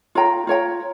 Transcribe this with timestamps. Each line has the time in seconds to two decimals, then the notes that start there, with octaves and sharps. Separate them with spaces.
0.15 F4 C#5 G5 A#5
0.47 F4 C#5 G5 A#5